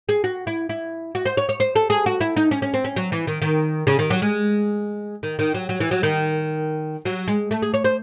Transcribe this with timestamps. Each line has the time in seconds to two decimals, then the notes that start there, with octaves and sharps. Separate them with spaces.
0.09 G#4
0.24 F#4
0.47 E4
0.69 E4
1.15 F#4
1.25 C5
1.37 C#5
1.49 C#5
1.60 C5
1.75 A4
1.90 G#4
2.06 F#4
2.21 E4
2.36 D#4
2.51 C#4
2.62 C#4
2.74 C4
2.84 C#4
2.96 F#3
3.12 E3
3.27 D#3
3.42 D#3
3.87 C#3
3.99 D#3
4.10 F#3
4.22 G#3
5.23 D#3
5.39 D#3
5.54 F#3
5.69 F#3
5.80 E3
5.91 F#3
6.03 D#3
7.05 F#3
7.28 G#3
7.51 A3
7.62 G#4
7.74 C#5
7.84 C5